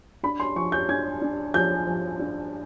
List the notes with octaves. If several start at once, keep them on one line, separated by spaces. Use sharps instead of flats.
D4 B5
C6
F3 C#6
G6
D4 G#6
D4
F3 G6
F3
D4